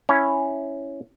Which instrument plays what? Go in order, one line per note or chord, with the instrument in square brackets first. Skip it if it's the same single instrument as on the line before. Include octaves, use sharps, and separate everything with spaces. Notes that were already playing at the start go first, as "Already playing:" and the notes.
[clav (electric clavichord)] C#4 E4